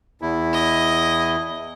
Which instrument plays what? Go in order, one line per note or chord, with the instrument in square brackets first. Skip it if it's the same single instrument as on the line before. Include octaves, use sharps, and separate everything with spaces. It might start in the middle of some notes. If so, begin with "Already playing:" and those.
[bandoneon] E2 E4
[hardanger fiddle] D#5